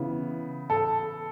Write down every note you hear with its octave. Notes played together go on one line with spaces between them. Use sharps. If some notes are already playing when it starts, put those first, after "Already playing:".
Already playing: C#3 E3 B3
A4